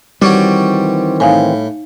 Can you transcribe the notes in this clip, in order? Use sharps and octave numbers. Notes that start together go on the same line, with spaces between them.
D#3 E3 G3 C4 F#4 C#5 D5
A2 D#4 F5 G#5